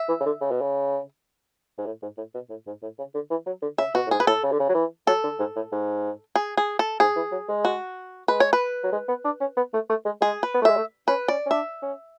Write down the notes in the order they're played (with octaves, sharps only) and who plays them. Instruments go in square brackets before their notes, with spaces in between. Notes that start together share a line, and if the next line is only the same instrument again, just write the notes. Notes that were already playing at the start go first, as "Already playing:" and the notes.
Already playing: [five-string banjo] E5
[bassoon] E3
C#3
D3
C#3
B2
C#3
G#2
A2
G#2
A2
B2
A2
G#2
A2
C#3
D3
E3
F#3
D3
[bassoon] C#3 [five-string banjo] E5
[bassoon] B2 [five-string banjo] F#4
[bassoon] A2
[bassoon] G#2 [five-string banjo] G#4
[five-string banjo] B4
[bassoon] A2 [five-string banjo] A4
[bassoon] C#3
D3
C#3
F#3
E3
[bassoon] F#3 [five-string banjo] A4
[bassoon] D3
G#2
A2
G#2
[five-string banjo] G#4
G#4
A4
[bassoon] G#2 [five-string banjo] G#4
[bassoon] E3
F#3
G#3
[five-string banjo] F#4
[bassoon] G#3 [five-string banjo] B4
[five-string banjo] C#5
B4
[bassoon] F#3
G#3
B3
D4
C#4
B3
A3
A3
G#3
[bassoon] G#3 [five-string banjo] G#4
[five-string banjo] B4
[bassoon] B3
A3
[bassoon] G#3 [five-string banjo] E5
[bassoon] A3
[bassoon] C#4 [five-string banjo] B4
[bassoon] C#4 [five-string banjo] D5
[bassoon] C#4
[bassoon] D4 [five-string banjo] E5
[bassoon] C#4